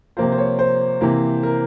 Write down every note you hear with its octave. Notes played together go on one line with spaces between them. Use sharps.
C3 F3 A#3 F4 C5
C5
C#5
C5
C3 E3 A#3
A#4